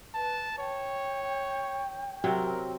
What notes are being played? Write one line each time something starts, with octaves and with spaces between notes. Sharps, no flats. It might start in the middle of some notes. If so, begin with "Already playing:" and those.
B4 A5
C#5 G5
C3 F#3 C4 A#4